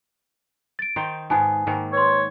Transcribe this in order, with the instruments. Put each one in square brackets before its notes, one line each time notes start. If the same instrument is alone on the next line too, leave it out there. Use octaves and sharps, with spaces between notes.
[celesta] A6 D7
[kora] D#3 D#4 C5
[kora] G#2 B3 G#4 [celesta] G#5 A5
[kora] G#2 D#3 A#3
[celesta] B4 C6 [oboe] C#5